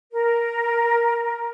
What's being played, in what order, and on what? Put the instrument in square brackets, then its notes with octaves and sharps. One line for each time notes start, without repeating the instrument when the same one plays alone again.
[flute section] A#4